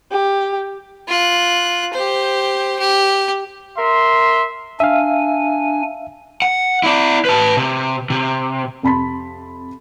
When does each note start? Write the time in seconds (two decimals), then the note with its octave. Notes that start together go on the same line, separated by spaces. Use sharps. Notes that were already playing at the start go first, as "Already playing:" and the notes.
0.11 G4
1.08 F4 F#6
1.93 G4 C5
2.79 G4
3.78 A#4 E5 C6
4.80 D4 E5 F5 G#5
6.42 F#5
6.83 E4 D5
7.25 B4 A5
7.57 C3
8.10 C3
8.83 F2 C3 A5 B5 C6 B6